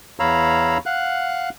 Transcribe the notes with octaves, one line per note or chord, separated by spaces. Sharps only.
E2 C#5 F5 A#5 B5 E6
F5 F#5 F#6